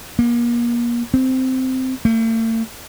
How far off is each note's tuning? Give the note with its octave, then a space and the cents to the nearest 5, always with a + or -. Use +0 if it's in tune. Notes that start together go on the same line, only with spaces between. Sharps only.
A#3 +35
C4 -10
A3 +45